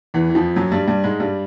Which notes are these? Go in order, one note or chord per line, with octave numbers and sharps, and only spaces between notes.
E2 E3
E3
F2 F3
F#2 F#3
G2 G3
G2 G3
G#2 G#3
G2 G3